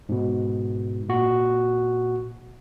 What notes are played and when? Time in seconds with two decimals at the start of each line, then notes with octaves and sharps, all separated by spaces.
0.09 G#2 B2
1.09 A#2 F#4